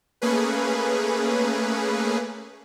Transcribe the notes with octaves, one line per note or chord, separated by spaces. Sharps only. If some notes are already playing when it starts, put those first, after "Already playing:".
A3 A#3 C#4 G#4 B4